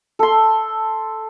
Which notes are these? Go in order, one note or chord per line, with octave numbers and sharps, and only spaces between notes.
A4 C6